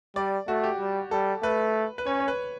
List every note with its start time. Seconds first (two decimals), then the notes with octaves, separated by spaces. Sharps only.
0.16 G3 D5
0.48 A3 F#4
0.63 G4
0.79 G3
1.11 G3 A4
1.43 A3 B4
1.98 B4
2.06 C#4 C#5
2.20 C#5
2.28 B4